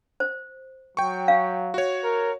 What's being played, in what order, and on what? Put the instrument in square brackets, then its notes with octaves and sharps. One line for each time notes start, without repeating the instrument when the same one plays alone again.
[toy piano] C5
[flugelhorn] F#3 [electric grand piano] G5 C#6
[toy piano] F5
[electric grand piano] F#4 C#5
[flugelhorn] A#4